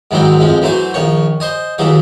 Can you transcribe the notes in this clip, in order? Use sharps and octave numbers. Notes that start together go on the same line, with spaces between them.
G#2 D#3 E3 F#3 G#3 C4
A1 F2 F3 G#3
E3 F#3 A3 C5 G#5
A#1 D#3 C#5
C5 D#5 G#5
D#2 E3 F#3 G#4